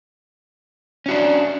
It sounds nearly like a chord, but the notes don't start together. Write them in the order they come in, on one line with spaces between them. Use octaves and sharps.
C#4 F#4 D4